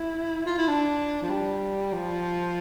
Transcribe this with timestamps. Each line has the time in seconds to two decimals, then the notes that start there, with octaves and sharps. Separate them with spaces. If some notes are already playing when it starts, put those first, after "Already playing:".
Already playing: E4
0.46 F4
0.58 E4
0.68 D4
1.22 F3
1.30 G3
1.93 F3